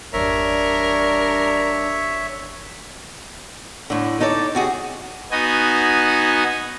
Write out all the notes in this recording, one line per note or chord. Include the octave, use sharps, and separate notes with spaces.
G1 E2 G3 D4 A#4 C#5 E5
A2 D3
D#4 A4 C#5 D5
C3 F#4 G#4
B3 D#4 F#4 D#5 G#5